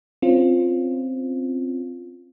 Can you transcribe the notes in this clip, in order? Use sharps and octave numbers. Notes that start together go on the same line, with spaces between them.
C4 C#4 F4